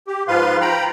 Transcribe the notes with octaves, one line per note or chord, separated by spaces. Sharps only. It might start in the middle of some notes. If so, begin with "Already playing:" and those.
G4
G#2 F3 F4 B4 F5 C6
G5 A#5 B5